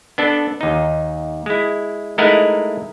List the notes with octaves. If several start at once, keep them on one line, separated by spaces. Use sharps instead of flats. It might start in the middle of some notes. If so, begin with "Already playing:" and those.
B3 D4 A4
D#2 D#4
G#3 E4
G#3 A3 D#4 E4 A#4 F#5